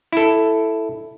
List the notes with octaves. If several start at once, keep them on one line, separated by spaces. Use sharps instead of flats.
E4 A4